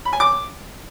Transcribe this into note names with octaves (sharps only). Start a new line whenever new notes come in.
B5
G#5
D6